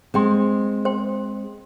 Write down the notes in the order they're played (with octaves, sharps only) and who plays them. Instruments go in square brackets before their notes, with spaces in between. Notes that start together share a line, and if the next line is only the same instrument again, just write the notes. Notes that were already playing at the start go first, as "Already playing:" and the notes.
[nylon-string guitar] G#3 C4 [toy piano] C5 G5 C6
[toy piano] C5 G5 C6